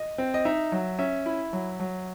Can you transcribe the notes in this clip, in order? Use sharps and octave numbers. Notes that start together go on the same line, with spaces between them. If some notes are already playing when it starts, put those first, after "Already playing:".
Already playing: D#5
C4
D#5
D#4 E5
F#3
C#4 E5
E4
F#3
F#3